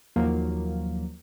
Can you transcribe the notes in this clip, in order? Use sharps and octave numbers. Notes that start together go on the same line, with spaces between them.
D#2 F3 F#3 A#3